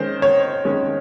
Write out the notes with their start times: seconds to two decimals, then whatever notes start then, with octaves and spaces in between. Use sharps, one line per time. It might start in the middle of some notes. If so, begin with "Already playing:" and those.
Already playing: D#3 G#3 C#4 C5
0.22 C#5
0.65 D#3 G#3 C#4